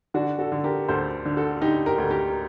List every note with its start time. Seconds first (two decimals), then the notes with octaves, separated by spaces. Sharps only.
0.14 D3 D4 F#4
0.39 F#4 A4
0.52 D3
0.64 G4 A#4
0.88 D2 A4 C5
1.25 D3
1.37 F#4 A4
1.62 D3 D#4 G4
1.86 G4 A#4
1.98 D2
2.11 G4 A#4